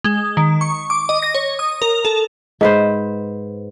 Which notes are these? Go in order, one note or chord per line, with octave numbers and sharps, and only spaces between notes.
G#3
D#3
C#6
D6
D#5
A#6
C#5
D#6
A#4
A4
G#2 B4 C5